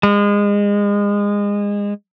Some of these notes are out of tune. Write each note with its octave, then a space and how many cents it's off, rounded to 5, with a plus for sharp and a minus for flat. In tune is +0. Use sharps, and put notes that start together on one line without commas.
G#3 -25